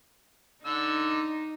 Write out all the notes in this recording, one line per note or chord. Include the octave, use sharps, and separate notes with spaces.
D3 D#4 E6